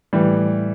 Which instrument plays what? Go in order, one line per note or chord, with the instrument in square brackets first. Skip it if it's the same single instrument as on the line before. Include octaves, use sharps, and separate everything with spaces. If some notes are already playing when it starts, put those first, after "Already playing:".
[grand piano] A2 E3 G3